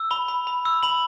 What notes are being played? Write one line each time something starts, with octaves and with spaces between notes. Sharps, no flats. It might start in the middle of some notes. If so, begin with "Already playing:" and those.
Already playing: E6
B5 G7
B5
B5
E6
B5 F#7